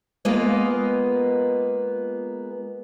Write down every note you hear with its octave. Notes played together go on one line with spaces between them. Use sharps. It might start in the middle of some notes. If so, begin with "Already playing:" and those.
G#3 A#3 B3 F4 D#5